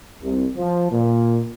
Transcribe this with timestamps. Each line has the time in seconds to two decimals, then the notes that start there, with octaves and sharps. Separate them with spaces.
0.22 C2
0.56 F3
0.91 A#2